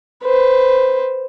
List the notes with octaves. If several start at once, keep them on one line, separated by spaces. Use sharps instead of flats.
B4 C5